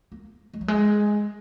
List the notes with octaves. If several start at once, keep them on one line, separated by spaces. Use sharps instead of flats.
A#3
G#3
F#3
G#3